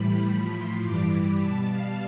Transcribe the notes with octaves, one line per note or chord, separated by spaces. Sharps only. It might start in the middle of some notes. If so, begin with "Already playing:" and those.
Already playing: A2 E3 G3 B5
A2 F3
C6
G2 E3 G3 D6
B5
B2 G3 A5
F5